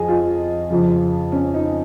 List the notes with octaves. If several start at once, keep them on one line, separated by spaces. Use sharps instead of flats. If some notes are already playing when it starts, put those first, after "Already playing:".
Already playing: F2 F3 G#4 D#5
F4
F2 C#3 F3
C#4
D#4